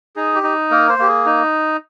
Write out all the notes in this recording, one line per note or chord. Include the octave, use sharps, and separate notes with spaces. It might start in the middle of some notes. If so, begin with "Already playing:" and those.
D#4 G#4
G4
D#4
A#3 A#4
C5
A#3 G4
G#4
D#4